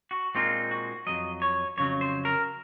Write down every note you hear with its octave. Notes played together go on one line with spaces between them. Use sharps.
F#4
A#2 G#3 C4 D#4 F4
F#4
F2 C#3 F#3 D#5
C#5
F2 C#3 F#3 C#5
C5
A#4